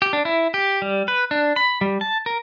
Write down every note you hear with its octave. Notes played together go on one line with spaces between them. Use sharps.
G4
D4
E4
G4
G3
B4
D4
B5
G3
A5
A#4